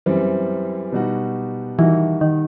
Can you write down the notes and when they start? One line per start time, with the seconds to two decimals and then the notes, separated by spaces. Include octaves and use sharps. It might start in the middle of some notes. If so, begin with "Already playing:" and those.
0.06 F#2 E3 G3 C4
0.92 B2 G3 D#4 F#4
1.78 D#3 E3 G3 D#4 F#4
2.21 D#3